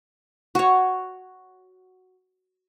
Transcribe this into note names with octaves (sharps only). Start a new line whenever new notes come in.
F#4 C#5